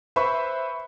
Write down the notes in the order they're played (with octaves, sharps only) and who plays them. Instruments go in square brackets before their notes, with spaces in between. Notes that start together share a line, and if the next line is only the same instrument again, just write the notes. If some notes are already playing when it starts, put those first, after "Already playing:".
[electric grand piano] B4 C5 E5 [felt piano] B5 C#6